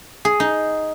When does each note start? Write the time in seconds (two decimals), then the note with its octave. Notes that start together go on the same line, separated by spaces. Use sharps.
0.25 G#4
0.40 D#4